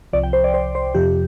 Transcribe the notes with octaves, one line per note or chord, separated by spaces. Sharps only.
C2 C3 F3 D5
G5
C5
D5
C5
C5
F2 C3 F3 G4